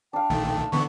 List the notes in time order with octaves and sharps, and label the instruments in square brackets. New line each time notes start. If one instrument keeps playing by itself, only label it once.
[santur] D4 F5 [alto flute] G5
[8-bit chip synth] A#1 D#3 A3
[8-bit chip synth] D3 E3 B3 [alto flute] C#6